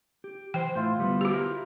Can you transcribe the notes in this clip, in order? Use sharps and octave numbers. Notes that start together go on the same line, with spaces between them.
G4
E3 C5 G5
A2 E4 F4 C5
D2 G3 B3
F#4 G4
E4 A#4